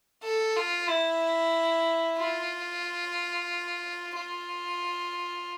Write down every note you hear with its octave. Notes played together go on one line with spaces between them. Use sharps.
A4
F4
E4
F4
F4